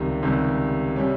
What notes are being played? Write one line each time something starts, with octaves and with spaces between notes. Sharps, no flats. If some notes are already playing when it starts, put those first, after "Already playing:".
Already playing: C#2 C3 D#3 G3
C#2 C3 D#3 G3
C3 G3 C#4